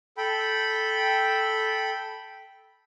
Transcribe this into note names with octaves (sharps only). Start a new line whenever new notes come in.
A4 G5 B5